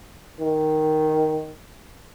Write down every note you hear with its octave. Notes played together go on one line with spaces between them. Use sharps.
D#3